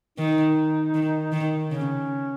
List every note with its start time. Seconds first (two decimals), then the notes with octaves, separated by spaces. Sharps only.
0.18 D#3 D#4
0.94 D#3
1.32 D#3
1.70 C#3 C#4